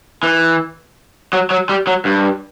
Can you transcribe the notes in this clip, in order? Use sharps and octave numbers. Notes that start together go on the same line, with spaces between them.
E3
F#3
F#3
G3
F#3
G2